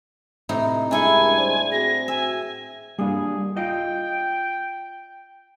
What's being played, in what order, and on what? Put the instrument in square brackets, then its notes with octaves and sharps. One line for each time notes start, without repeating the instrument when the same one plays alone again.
[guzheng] A2 C3 D#4
[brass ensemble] C#2 G3 G#3 [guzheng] D4 E4 A4 [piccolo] G#5
[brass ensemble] C5 D5
[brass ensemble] C4 F#4 G#4 [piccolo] A#6
[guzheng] E5 [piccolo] G#5
[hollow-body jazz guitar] G3 A#3 D4 [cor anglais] G#4
[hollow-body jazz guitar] F4 D5 D#5 [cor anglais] G5